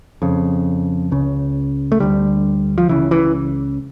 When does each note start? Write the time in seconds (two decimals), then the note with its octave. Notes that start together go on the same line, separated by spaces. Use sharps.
0.22 F2 C#3
1.11 C#2 C#3
1.92 A3
2.00 D2 D3 G3
2.78 F3
2.89 C#2 C#3 E3
3.11 E3